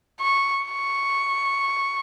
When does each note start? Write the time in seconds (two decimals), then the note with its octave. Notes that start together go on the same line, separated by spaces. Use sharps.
0.21 C#6
0.65 C#6